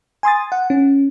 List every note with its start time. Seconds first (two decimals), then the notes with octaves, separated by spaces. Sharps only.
0.23 G#5 C6 D#6 A6
0.52 F#5
0.70 C#4